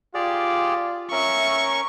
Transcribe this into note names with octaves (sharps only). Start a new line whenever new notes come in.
F4 G4 G#4 D5
C#4 A#4 E5 C#6